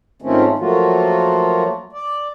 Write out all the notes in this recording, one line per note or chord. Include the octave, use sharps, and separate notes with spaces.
G#2 D#3 F3 A3 C4 C#4
F3 F#3 A3 A#3 F4 F#4
D5